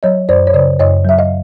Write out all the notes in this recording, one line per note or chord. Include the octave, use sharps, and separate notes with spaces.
F#3 C#5 D#5
F#2 C5 D5
C#5
C#3 C5 D5
F#2 C#5 D#5
F#3 E5
D#5 F5